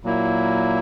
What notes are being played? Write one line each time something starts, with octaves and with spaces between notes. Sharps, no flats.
A#2 F#3 A#3 E4